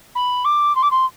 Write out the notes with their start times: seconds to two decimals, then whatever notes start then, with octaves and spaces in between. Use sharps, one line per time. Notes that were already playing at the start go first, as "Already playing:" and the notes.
0.15 B5
0.45 D6
0.75 C6
0.82 D6
0.91 C6